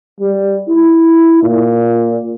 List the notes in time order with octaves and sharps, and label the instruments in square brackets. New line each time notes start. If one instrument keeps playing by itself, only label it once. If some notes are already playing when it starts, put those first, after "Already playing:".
[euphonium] G3
E4
A#2